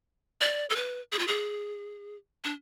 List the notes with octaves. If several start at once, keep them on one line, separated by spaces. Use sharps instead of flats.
D5
A4
B4
G#4
F4
G#4
D4